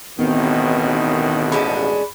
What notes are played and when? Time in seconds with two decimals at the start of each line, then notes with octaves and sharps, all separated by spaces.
0.19 A1 D#2 B2 D#3 B3 C4
1.52 G#3 C#4 D4 B5